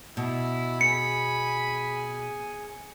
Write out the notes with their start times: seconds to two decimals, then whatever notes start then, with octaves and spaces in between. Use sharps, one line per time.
0.17 B2 E4
0.81 G#4 G#5 B5 C#7